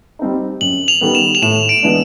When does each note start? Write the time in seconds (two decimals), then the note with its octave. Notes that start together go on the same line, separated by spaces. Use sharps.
0.19 G3 C4 D#4
0.61 F#2 F#7
0.88 F7
1.01 D#3 G3 B3
1.15 E7
1.35 F7
1.42 A2 E7
1.69 D7
1.83 E3 G#3 B3 D4